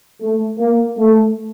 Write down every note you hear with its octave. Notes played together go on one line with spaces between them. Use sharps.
A3
A#3
A3